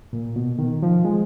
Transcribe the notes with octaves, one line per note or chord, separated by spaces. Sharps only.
A#2
B2
D#3
F3
G#3